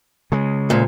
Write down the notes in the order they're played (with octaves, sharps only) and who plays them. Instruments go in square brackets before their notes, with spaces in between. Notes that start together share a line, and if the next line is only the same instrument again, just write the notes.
[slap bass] C#3 G#3
[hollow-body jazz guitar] D2 A#2